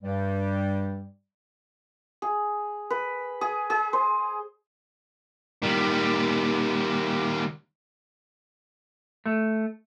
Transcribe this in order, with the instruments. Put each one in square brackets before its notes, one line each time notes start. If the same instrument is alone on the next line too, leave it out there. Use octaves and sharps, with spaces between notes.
[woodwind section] G2 G3
[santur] G#4
B4
G#4
G#4
C5
[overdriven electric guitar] D#3 G3
[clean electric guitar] A3